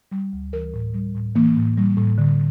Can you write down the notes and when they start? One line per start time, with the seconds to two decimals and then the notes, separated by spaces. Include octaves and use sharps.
0.12 G3
0.33 D2
0.53 E3 A#4
0.74 A2
0.94 G3
1.15 A2
1.35 E3 A#3
1.57 A2
1.78 G3
1.97 A2
2.18 D3